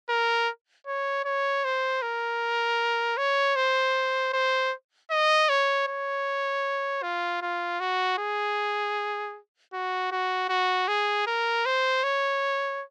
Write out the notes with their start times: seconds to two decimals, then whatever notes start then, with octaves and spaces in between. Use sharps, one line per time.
0.09 A#4
0.87 C#5
1.25 C#5
1.64 C5
2.02 A#4
3.17 C#5
3.56 C5
4.33 C5
5.11 D#5
5.49 C#5
5.88 C#5
7.02 F4
7.42 F4
7.80 F#4
8.18 G#4
9.73 F#4
10.12 F#4
10.49 F#4
10.88 G#4
11.27 A#4
11.66 C5
12.03 C#5